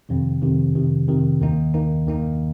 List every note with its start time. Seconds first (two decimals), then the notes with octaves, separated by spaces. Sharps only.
0.09 F2 C3 D#3
0.41 F2 C3 D#3
0.75 F2 C3 D#3
1.08 F2 C3 D#3
1.41 D#2 D#3 A#3 D#4
1.74 D#2 D#3 A#3 D#4
2.06 D#2 D#3 A#3 D#4